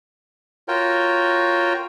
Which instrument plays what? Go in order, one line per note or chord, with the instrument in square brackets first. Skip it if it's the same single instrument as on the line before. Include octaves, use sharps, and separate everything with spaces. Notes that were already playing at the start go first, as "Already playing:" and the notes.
[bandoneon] F4 F#4 A#4 C#5 G5